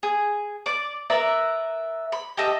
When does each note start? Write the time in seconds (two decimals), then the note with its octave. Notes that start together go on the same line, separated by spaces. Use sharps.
0.03 G#4
0.66 D5 D6
1.10 A#4 B4 D5 E5
2.12 B5
2.37 G4 A4 D#5 E5